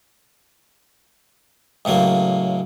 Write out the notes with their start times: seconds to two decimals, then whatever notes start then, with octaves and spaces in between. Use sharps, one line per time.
1.85 C#2 A2 F#3 A#3